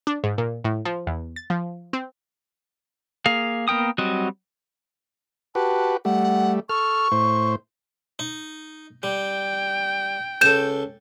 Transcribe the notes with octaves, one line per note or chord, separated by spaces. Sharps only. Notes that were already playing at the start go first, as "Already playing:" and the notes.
D4
G#2
A#2
A2
F3
E2
A6
F3
C4
A#3 G#4 F5
A#3 B3 A#4 G5 D#6
F#3 G3 C4 F#4 D#5
F#4 G4 B4 A5
G3 A3 F#5
A4 C#6 F6
A2 C5
D#4
G3 G5
C#2 A4 G6 E7